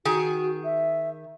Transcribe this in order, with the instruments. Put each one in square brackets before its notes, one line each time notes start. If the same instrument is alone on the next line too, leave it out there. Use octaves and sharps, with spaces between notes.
[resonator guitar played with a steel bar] D#3 G#4 [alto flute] F#4
[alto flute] E5